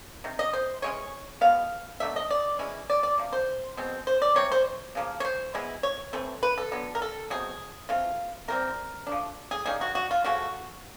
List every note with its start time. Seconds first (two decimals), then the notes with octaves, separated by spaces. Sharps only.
0.24 C3 D#3
0.39 D#5
0.53 C5
0.82 E3 G#3 C#4 C#5
1.41 B2 G#3 B3 F5
2.00 B2 F#3 A3 D4 E5
2.16 D#5
2.31 D5
2.59 E3 G#3 C#4 E4
2.90 D5
3.03 D5
3.18 C3 F3
3.33 C5
3.77 B2 G#3 C4
4.07 C5
4.22 D5
4.36 C3 E3 G3 C4 C#5
4.52 C5
4.95 C#3 F3 A#3
5.20 C#5
5.25 C5
5.54 E3 G#3 B3 E4
5.83 C#5
6.13 E3 A3 C4
6.43 B4
6.58 A4
6.72 D3 F#3 B3
6.95 A#4
7.02 A4
7.30 B2 F#3 A3 C4 G#4
7.89 E3 A3 C4 F4
8.48 C3 E3 G3 C4 A#4
9.07 F3 A3 D4
9.51 G#4
9.66 D#3 G3 A#3 C#4 G#4
9.81 F#4
9.95 F#4
10.11 F4
10.24 C#3 F3 A3 C#4 F#4